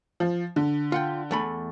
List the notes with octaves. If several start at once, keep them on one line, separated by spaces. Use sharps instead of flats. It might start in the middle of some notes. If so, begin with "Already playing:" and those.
F3
D3
F4 F#5 G5
E2 A3 B5